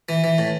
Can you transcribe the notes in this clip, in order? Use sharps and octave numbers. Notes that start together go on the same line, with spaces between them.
E3
E3
A2